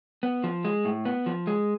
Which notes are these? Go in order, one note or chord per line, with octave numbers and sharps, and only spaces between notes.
B3
F3
G#3
A2
B3
F3
G#3